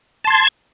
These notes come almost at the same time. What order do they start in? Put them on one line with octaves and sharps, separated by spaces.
A5 C6 G#6